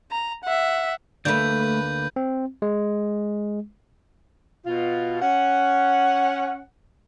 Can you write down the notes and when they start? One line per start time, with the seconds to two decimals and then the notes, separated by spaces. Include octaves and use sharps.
0.11 A#5
0.44 E5 F#5
1.25 D2 D3 A3 A#3 B4 D5 G6
2.16 C4
2.62 G#3
4.66 B2 F4
5.22 C#4 F#5